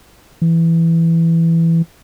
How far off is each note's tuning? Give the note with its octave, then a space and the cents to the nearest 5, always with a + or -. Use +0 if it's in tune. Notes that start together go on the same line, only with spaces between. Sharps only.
E3 +5